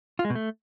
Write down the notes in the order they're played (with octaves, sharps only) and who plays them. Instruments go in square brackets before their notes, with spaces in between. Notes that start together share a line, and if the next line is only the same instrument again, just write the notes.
[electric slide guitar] F4
G#3
B2
A3